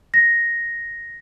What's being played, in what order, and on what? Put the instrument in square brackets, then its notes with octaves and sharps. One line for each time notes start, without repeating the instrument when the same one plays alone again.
[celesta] A#6